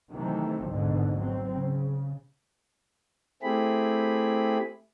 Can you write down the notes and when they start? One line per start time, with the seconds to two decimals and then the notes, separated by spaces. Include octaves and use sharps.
0.12 C3 D#3 E3 F#3 A3 C4
0.67 G#1 D2 G#2 B2 D3
1.18 F#3 C4
1.54 C#3
3.43 A3 C4 E4 G4 G#4 B5